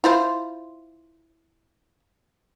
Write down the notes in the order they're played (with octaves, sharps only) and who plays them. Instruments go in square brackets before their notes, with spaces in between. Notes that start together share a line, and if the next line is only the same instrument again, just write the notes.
[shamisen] E4 F4 C5